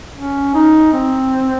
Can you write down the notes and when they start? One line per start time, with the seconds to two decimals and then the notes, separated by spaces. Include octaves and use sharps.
0.17 C#4
0.55 D#4
0.92 C4